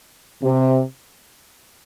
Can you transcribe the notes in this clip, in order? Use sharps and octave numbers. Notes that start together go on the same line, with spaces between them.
C3